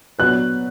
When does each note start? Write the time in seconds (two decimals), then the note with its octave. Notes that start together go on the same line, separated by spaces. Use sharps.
0.19 F#3 B3 D4 F#4 B4 F#6